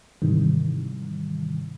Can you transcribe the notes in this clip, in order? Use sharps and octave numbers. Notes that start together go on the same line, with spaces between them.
G#2 C3 D#3 E3 G3